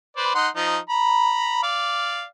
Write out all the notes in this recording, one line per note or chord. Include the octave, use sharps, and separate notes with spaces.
B4 C5 D5
D#4 F#5 C6
F3 D#4
A#5 B5
D5 F5